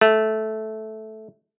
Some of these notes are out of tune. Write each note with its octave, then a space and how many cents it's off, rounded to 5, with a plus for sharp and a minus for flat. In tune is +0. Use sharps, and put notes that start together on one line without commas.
A3 -10